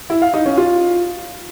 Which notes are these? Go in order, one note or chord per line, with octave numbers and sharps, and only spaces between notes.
E4
F5
D#4
C#4
F4